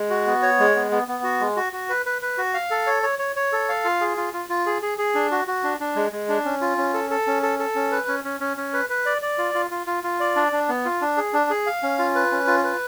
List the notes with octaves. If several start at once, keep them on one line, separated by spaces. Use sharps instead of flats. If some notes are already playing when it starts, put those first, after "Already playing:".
Already playing: G#3
F#4
B3
C#5
G#3
B3
B3
B3
F#4
G#3
F#4
F#4
B4
B4
B4
F#4
F5
A4
C#5
C#5
C#5
C#5
A4
F5
F4
G#4
F4
F4
F4
G#4
G#4
G#4
D4
F#4
F#4
D4
D4
G#3
G#3
D4
C#4
F4
C#4
A4
A4
C#4
A4
A4
C#4
B4
C#4
C#4
C#4
C#4
B4
B4
D5
D5
F4
F4
F4
F4
F4
D5
D4
D4
B3
F4
D4
G#4
D4
G#4
F5
C#4
F4
B4
C#4
F4
B4